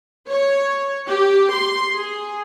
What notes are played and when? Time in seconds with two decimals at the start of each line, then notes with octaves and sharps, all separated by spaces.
0.29 C#5
1.08 G4
1.53 C6
1.96 G#4